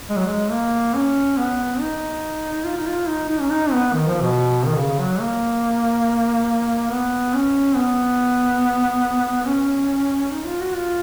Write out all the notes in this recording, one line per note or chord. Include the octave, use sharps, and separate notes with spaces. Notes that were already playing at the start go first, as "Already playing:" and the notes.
G#3
F#3
G#3
A#3
C#4
B3
D#4
F4
D#4
F4
D#4
D#4
C#4
D#4
B3
D#3
F3
B2
D#3
C#3
F#3
A#3
B3
C#4
B3
C#4
D#4
F4
F#4
F4